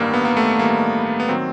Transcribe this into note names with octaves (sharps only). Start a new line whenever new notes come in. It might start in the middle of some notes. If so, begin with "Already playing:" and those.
Already playing: A1 G2 D#3 G3 A#3
B3
A#3
A3
A1 G2 D#3 G3 A#3
B3
D#3 F#3 C4